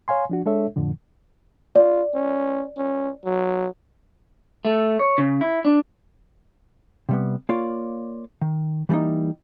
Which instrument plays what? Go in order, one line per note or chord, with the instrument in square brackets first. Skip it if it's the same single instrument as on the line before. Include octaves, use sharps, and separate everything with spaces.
[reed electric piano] C#5 F5 G#5 C6
F3 D4 F#4
G#3 D4 A4 C#5 E5
F2 A2 D3 F3
[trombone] F4 [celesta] D5
[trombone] C#4
C#4
F#3
[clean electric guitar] A3
C#5
C#3
E4
D4
[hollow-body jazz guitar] C3 G3 B3
A#3 F4 C#5 D5
D#3
E3 G3 A3 A#3 D#4